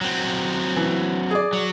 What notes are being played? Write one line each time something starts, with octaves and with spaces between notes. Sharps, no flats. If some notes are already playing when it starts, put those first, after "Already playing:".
F#3 C4
E3
G#4 D5
F#3